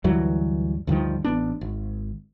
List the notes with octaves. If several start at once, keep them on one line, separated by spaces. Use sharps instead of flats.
D2 G2 E3 F#3
D2 G2 D#3 F3
A1 B3 D4
G#1